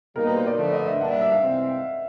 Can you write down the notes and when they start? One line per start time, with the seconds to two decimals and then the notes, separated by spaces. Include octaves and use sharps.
0.16 B2 G3 A#3 D#4 A#4
0.27 B4
0.36 C5
0.47 D5
0.58 D3 F3 A3
0.72 D#5
0.86 E5
1.00 A#2 G3 A#3 D4 F#5
1.11 E5
1.21 E5
1.32 F5
1.43 C2 C3 E3 G#3 C4